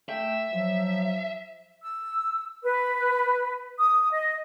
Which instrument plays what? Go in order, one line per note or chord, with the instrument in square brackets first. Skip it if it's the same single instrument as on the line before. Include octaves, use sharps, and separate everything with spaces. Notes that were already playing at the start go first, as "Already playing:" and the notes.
[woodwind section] A3 G5 [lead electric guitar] E5
[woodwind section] F3 F#3
[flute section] E6
B4
D#6
D#5